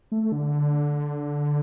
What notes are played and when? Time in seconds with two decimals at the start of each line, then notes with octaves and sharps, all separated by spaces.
0.12 A3
0.32 D3